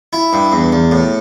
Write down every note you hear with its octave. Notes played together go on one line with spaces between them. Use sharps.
E4
G2
E2
E2
A2